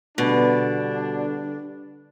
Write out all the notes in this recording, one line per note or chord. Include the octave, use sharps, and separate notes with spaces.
B2 D3 G3 D4